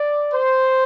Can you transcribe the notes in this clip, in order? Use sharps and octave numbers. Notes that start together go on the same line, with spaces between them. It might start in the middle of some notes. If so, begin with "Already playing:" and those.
Already playing: D5
C5